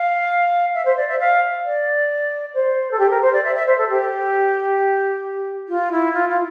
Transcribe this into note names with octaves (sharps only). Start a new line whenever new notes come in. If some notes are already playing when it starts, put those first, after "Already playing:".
Already playing: F5
E5
C5
D5
E5
F5
D5
C5
A4
G4
A#4
C5
D5
E5
E5
C5
A4
G4
F4
E4
F4
F4